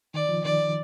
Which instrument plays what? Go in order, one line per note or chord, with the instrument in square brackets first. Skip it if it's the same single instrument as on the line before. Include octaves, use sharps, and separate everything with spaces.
[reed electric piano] D#3 [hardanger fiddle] D5
[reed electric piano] F3
[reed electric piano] D#3 [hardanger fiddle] D5